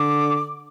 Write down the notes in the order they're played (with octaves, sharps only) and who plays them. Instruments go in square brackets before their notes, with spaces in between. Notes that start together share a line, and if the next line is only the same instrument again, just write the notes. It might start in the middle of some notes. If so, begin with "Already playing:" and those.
Already playing: [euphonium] D3 [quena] D6